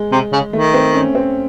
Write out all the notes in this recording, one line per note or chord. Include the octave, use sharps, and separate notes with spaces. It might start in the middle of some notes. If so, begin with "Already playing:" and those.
Already playing: G#3
C3
C#3
D#3 A3
C4
C#4
C4